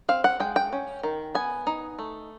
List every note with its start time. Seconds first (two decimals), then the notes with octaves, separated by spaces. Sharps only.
0.09 C4 F5
0.24 F#5
0.40 G#3 G5
0.56 G5
0.73 C#4
1.03 D#3
1.35 B3 G#5
1.67 D#4
1.99 A3